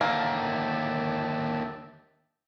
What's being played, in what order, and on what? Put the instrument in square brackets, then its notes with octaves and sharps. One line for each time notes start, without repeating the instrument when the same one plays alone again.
[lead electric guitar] D#2 D3 [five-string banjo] A#3 [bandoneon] E5 G5 A5